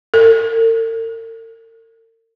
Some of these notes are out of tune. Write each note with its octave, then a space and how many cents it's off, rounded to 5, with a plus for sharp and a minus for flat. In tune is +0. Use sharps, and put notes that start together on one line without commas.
A#4 -45